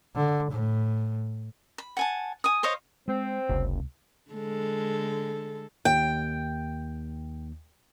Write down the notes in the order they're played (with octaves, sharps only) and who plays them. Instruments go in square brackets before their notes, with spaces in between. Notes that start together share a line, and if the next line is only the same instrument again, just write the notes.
[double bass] D3
A2
[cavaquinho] B5
F#5 G#5 A5
G#5 D#6
C5 C#5 D#5 F5
[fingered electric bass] G#3 [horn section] C4
[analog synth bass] F#1 [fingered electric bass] C#2 C3
[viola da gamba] D3 G#3 A4
[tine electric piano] D#2 [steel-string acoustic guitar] G5